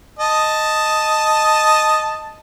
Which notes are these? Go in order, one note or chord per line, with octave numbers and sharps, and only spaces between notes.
D#5 A5